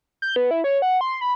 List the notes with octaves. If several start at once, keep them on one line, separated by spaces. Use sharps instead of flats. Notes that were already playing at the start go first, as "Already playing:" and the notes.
G6
B3
E4
C#5
F#5
C6
B5